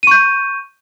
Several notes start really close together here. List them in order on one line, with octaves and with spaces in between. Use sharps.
D#7 C#6 G6